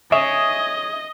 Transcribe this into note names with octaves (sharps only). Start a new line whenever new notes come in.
G#4 C#5 D#5 E5